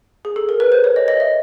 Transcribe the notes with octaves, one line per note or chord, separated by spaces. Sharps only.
G#4
A4
A#4
B4
C5
C#5
D#5
D#5
E5